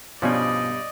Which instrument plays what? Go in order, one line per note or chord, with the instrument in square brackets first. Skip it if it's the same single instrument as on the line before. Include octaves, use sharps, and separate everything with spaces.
[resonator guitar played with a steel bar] G2 G3 [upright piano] B2 [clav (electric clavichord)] F3 C#4 [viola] D5 D#5